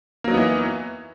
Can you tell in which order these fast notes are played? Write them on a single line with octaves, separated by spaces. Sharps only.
A#3 F#3 D#4 B3 E3